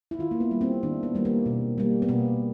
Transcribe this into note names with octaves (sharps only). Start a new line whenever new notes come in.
E4
D#3 F4
A#3
B3
G3 A#3
C4
D#3 D4
B3
G3 A#3
A#3
B2
G3 A#3
B3
B2 A#3